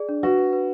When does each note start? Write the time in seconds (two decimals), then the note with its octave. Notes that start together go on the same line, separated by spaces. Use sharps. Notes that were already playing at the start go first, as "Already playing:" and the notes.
Already playing: G#4 D5
0.09 D4
0.23 F#4 B4
0.38 B4
0.53 B4